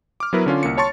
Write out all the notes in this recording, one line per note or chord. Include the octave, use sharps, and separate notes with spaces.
D6 F6
F#3 B3 E4 A#4 B4
D3 C#4 F4
C2 A#3 C#7
C#5 A5 C6 C#6 A6 C#7